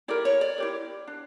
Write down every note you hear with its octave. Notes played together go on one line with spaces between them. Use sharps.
E4 G4 A#4 D5
C#5
D5
E4 G4 A#4
D4